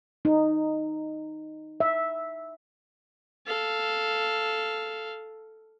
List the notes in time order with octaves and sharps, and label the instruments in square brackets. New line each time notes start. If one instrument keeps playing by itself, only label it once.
[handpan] D#4
E5
[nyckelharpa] A4 F5